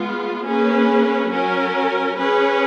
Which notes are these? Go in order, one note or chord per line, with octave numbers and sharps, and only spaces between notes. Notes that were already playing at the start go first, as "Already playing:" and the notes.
Already playing: G#3 B3 F4
A#3 C#4 G#4 B4
F#3 C#4 F#4 A#4
C#4 G#4 B4